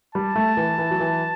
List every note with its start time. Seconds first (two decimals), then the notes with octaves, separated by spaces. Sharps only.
0.15 G3 A5
0.35 A3
0.57 E3
0.78 E3
0.91 F#3
1.00 E3